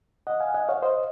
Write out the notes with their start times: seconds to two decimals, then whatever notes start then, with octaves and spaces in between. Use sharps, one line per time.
0.27 D#5 F#5
0.40 F5 G#5
0.54 D#5 F#5
0.68 C#5 F5
0.83 C5 D#5